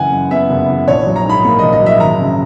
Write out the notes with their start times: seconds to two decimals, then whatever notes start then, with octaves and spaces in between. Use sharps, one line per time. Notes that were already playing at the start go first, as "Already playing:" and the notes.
Already playing: F#1 C#3 E3 F#5 G#5
0.12 F#2
0.30 B3 E5
0.50 F#1
0.68 E3
0.88 A#1 C#5
1.06 F#3
1.16 A#5
1.25 G#2 B5
1.45 A#3
1.59 A#1 D#5
1.72 D#5
1.82 F#3 E5
2.00 G#1 A#5
2.19 C#3